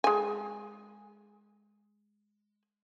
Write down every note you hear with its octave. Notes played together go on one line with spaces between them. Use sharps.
G#3 G#5